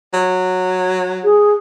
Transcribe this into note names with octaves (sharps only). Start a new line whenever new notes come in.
F#3
G#4